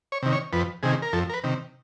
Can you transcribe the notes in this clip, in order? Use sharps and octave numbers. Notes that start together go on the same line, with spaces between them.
C#5
C3 D#3
C#5
F2 B4
C3 D#3 G#4
A#4
F2 A4
A#4
B4
C3 D#3